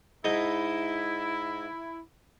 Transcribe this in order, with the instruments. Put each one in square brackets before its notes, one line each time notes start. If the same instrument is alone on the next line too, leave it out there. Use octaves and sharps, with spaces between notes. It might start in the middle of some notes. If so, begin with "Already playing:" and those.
[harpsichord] G#2 D#4 D#5 [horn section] E4